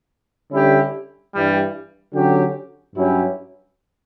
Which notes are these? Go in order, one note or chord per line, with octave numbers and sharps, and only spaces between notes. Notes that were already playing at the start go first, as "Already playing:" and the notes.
D3 G3 C#4 E4 G4
G2 E3 G3
D3 F#3 C#4 G4
G2 F#3 C#4 E4 G4